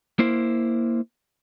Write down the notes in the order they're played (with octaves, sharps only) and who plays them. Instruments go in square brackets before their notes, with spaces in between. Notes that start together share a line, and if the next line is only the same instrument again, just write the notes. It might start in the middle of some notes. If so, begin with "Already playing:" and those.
[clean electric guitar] A#3 E4 C5